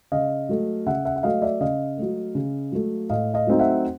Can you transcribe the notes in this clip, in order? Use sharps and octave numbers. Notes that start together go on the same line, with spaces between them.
C#3 D#5 F5
F#3 A3
C#3 E5 F#5
E5 F#5
F#5
F#3 A3 D#5 F5
D5 E5
C#3 D#5 F5
F#3 A3
C#3
F#3 A3
A2 D#5 F5
D#5 F5
F#3 A3 C4 D#4
E5 F#5